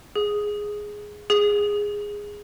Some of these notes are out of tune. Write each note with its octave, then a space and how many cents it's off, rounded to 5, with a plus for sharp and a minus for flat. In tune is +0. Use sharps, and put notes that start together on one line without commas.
G#4 +0
G#4 -10